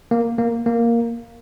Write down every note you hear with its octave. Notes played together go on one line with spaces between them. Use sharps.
A#3
A#3
A#3